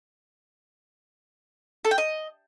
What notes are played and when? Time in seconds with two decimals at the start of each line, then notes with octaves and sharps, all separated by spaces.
1.85 A4
1.91 G5
1.98 D#5